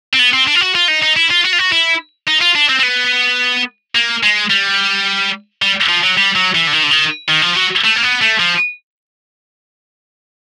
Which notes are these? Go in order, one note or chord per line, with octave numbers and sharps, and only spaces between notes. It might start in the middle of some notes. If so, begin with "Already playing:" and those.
C4
B3
C4
D4
F4
F#4
F4
D#4
D#4
E4
F4
F#4
F4
F#4
E4
D#4
F4
D4
C4
C4
B3
A#3
G#3
G3
G3
F3
F#3
G3
F#3
E3
D3
D#3
D3
D#3
D#3
F3
F#3
A3
A#3
B3
A3
F3